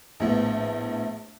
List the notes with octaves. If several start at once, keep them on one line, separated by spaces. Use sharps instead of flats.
A#1 A2 B3